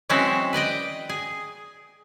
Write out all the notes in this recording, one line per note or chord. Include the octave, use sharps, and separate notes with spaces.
E3 F#3 G#3 C4 C#4 E4
B4 D5 D#5 G5
G#4